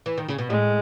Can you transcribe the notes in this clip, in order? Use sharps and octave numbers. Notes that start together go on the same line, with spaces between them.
E3
D#3
C#3
B2
A2 G#3